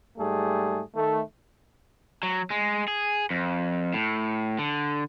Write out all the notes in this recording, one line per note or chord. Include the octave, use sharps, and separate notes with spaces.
G#2 G3 A3 G#4
D#3 A3
F#3
G#3
G#4
F2
A2
D3